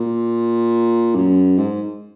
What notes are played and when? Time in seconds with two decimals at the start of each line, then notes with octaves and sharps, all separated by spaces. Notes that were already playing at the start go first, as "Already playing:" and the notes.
Already playing: A#2
1.15 F#2
1.58 G#2